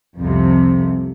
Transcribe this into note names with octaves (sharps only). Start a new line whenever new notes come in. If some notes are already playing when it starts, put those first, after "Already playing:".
C2 F2 C3